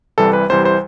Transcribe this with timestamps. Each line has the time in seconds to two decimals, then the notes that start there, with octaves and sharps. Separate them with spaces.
0.18 C2 C3 E3 G3 A4
0.33 B4
0.50 C2 C3 E3 G3 C5
0.65 C5